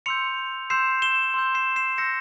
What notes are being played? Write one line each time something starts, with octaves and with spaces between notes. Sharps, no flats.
C6 E6 G6 C#7 F7
C6 E6 G6 C7 E7
E7 G7
C6 E6 G6
C7 E7
C7 E7
C6 E6 G6 A#6 C#7